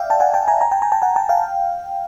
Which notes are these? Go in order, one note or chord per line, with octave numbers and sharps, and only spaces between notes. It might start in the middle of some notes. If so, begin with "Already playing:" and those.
Already playing: D5 E5 F5 G5
G5 A5
F#5 G#5
G5 A5
G#5 A#5
G#5 A#5
G5 A5
G#5 A#5
G5 A5
F#5 G#5
G5 A5
F5 G5